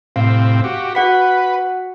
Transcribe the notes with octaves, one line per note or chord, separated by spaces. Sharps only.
A2 C3 C4 F5
F#4 G4
F#4 B4 F#5 B6